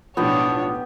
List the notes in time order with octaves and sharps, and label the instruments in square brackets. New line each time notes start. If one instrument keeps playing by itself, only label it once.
[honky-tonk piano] B1 A2 F3 [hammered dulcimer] B3 G4 [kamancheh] D4 C#5